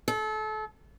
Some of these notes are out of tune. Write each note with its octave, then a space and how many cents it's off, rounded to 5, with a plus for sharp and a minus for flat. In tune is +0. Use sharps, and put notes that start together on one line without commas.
A4 -30